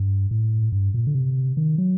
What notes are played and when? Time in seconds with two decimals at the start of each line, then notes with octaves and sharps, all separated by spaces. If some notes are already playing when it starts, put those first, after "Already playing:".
Already playing: G2
0.31 A2
0.72 G2
0.94 A#2
1.07 D3
1.15 C3
1.57 D#3
1.78 F#3